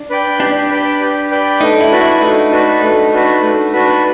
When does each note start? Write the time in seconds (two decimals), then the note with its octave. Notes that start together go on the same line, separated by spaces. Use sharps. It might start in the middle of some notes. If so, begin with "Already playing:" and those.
Already playing: D4
0.10 B4 D5 G5
0.40 D4 G4
0.71 B4 D5 G5
1.01 G4
1.31 B4 D5 G5
1.61 A3 D#4
1.81 E4
1.91 D4 F#4 B4
2.01 E4
2.21 A3 D#4
2.51 D4 F#4 B4
2.82 A3
3.13 D4 F#4 B4
3.43 A3
3.73 D4 F#4 B4